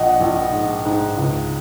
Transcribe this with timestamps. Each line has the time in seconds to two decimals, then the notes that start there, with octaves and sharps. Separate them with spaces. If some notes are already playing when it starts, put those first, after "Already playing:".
Already playing: A#1 D#5 F#5
0.20 A#1
0.52 G#2
0.85 G#2
1.17 C#2